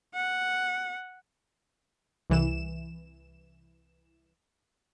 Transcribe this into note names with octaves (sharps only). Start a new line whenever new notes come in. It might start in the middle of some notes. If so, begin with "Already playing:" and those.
F#5
C2 E3 E7